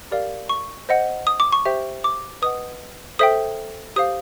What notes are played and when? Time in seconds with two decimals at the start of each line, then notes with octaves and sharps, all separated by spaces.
0.11 G4 A#4 D5 F5
0.49 C#6
0.89 C5 D#5 F#5
1.27 D#6
1.40 D6
1.52 C#6
1.65 G4 C5 E5 G5
2.04 D6
2.42 B4 D#5 F#5 D#6
3.19 A4 C5 E5 G5 D#6
3.96 G4 C5 F5 D#6